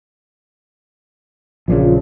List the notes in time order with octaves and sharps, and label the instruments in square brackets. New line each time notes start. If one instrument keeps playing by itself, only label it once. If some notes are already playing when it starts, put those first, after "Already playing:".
[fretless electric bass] A#1 A#2 C#3 [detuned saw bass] F3